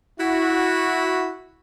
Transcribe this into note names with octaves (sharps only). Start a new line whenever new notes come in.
E4 F#4